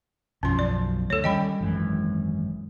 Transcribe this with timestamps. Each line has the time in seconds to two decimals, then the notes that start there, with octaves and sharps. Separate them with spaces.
0.43 B1 F#2 F3 C#4 C6
0.59 D5
1.10 D2 A4 C#5
1.24 D#3 G3 C#4 D#5 G5 B5
1.61 G#1 F#2 E3